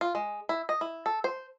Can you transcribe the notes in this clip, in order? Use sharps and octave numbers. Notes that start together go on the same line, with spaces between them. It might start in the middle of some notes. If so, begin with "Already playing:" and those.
F4
G#3
E4
D#5
E4
A4
C5